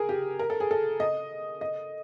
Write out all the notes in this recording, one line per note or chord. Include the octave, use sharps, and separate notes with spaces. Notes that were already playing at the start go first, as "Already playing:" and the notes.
Already playing: G#4 A#4
G4
A#4
A4
G#4
A4
D#5
D#5